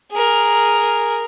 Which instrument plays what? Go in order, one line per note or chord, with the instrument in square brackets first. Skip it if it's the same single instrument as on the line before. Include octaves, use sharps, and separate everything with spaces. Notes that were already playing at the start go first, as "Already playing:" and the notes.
[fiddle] G#4 A#4